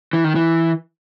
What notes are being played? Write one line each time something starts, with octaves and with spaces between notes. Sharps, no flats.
E3
D#3
E3